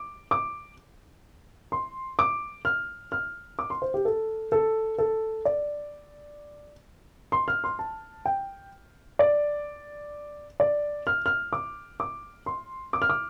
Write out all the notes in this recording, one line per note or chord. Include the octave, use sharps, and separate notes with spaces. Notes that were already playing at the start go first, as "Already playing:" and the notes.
Already playing: D6
D6
C6
D6
F6
F6
D6
C6
C5
G4
A4
A4
A4
D5
C6
F6
C6
A5
G5
D5
D5
F6
F6
D6
D6
C6
D6
F6
D6